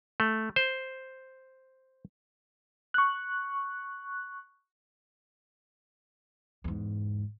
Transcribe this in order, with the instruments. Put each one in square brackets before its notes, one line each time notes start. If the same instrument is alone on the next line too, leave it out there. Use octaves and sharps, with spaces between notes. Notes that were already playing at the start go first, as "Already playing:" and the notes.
[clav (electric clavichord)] A3
C5
[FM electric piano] C#6 F#6
[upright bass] E2 G#2